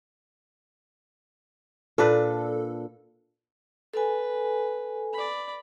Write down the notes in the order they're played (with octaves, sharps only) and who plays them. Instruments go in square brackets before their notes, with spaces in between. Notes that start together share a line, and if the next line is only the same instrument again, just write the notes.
[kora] A#2 D4 B4 [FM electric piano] A4
[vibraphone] A4 G#5 [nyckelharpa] B4
[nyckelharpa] D5 B5